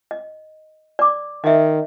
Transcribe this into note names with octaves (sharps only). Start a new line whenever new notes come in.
D#5
D5 D6
D#3 D#5 E5